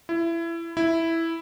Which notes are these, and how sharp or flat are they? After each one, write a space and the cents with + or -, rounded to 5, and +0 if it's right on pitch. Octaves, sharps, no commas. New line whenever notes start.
E4 +25
E4 +0